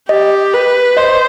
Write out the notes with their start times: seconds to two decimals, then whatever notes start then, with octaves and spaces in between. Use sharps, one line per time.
0.09 G4 D#5
0.53 B4
0.97 C5 D#5